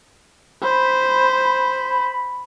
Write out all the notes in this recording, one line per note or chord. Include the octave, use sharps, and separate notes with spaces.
C5 B5